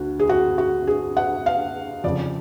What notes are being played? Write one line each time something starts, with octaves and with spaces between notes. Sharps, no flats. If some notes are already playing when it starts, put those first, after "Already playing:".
Already playing: D2 D3 F#4
G#4
F#4
F#4
G#4
F#5
F5
F2 C#3 D5